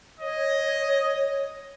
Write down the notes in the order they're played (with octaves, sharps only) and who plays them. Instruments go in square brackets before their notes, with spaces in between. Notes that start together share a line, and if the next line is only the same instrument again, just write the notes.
[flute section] C#5 [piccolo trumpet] D#5